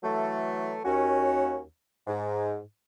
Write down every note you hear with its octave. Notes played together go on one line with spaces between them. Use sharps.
E3 F#3 A3
D#2 C#4 F#4
G#2